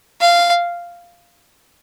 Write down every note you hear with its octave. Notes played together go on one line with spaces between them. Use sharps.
F5